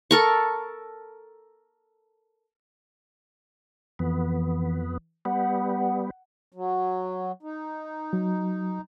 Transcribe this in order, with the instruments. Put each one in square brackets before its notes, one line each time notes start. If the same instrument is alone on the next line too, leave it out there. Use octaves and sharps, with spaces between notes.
[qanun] A4 A#4 C#6
[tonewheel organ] F2 B3 [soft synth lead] E3
[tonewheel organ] G3 B3 [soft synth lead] F#5
[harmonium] F#3
D#4
[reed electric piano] F#3